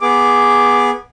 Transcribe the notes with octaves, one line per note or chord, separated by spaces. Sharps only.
B3 G#4 D6